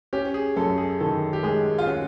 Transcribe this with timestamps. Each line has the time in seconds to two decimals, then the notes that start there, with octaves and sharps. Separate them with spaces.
0.13 C#4 G4
0.34 G#4
0.56 F#2 A4
0.78 G#4
1.00 D#3 A4
1.33 G4
1.43 G#3 G#4
1.79 F4
1.87 C#4 F#4